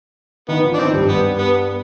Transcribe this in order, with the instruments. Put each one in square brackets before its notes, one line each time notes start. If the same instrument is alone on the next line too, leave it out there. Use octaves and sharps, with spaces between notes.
[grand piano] D#3 D#4 [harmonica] B3
[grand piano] F3 F4
[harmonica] D4
[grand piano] D#3 D#4 [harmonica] C4
[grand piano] G2 G3
[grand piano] G2 G3 [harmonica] B3
[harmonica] B3